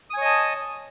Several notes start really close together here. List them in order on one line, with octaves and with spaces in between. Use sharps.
D#6 G#5 C#5 D#5 A5